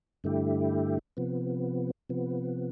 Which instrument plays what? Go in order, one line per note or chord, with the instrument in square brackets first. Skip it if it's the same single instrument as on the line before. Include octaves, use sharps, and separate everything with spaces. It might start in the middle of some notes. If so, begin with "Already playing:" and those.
[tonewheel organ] G2 D3 A3 E4 G4
C3 F3 B3
C3 F3 B3